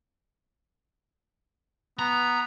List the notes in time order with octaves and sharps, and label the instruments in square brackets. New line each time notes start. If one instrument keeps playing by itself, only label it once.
[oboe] B3 [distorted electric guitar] A#5